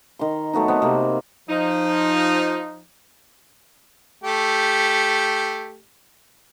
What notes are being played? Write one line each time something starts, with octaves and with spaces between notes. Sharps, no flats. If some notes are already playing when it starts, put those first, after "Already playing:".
D#3 C6
F#3 A3 B3 D#4
B3 C4
C3 A#3
F3 D#4
A3 G4